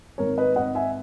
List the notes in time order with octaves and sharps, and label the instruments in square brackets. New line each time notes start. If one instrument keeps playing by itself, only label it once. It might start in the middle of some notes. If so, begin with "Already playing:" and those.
[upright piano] G#1 A#4 C#5
B4 D#5
G#1 D#5 F#5
E5 G#5